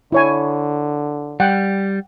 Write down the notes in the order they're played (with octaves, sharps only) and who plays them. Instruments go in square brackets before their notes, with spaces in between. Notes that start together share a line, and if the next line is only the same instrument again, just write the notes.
[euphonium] D3 [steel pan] E4 C#5 G#5
[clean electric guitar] G3 [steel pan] F#5 G5